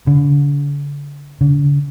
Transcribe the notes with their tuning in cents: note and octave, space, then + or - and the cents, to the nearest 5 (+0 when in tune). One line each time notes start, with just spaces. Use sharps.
D3 -40
D3 -45